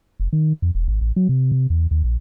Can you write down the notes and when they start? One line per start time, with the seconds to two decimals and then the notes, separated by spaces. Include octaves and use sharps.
0.20 F1
0.33 D#3
0.62 F2
0.75 E1
0.88 G#1
1.01 A1
1.16 F#3
1.29 C3
1.52 C3
1.70 E2
1.91 D#2
2.04 A#1